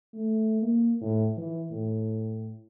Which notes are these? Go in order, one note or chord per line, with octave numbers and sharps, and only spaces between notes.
A3
A#3
A2
E3
A2